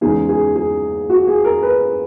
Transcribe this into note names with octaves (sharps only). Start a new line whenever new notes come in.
E2 C#3 G#3 D#4 G#4
G#4
G#4
F#4
G#4
A#4
B4